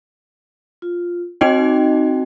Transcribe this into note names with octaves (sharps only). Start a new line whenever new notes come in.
F4
C4 D#4 F#4 D#5 G5